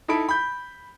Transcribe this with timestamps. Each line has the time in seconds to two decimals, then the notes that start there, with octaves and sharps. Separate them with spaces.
0.08 D#4 E4 A4 B5 D7
0.29 B5 G6